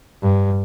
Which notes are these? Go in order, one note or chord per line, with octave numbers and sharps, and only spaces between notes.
G2